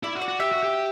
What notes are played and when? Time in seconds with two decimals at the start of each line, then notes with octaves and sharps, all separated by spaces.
0.03 E4 D5
0.15 F#4
0.22 D5
0.28 F#4
0.40 G4 E5
0.52 F#4
0.63 G4